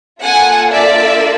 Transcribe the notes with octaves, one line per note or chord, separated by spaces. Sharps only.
A#3 D4 F4 A4 F#5 G#5
D5 E5